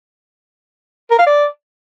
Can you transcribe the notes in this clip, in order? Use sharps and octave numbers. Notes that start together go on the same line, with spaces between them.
A#4
F5
D5